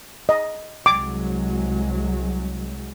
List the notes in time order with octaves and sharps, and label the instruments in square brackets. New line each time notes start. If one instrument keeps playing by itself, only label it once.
[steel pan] D#5
[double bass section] C2 F#3 G#3 [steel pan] D6